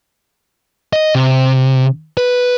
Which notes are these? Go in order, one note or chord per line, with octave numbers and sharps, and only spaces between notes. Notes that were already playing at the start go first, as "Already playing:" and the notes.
D#5
C3
B4